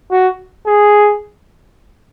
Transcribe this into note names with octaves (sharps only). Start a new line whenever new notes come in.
F#4
G#4